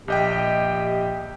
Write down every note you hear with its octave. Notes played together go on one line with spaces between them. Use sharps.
A#1 G4 D#5 G5